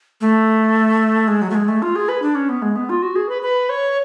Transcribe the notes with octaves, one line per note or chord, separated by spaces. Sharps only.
A3
G#3
F#3
A3
G#3
A3
F4
G#4
B4
D4
C#4
B3
G#3
B3
F4
F#4
G#4
B4
B4
C#5